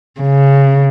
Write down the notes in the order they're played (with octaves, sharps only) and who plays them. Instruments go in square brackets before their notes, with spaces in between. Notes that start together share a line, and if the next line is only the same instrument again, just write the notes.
[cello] C#3